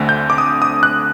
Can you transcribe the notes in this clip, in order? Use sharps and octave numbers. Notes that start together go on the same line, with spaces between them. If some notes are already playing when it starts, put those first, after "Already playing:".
Already playing: D2 D3 A3 C4
G6
D6
D#6
D#6
F#6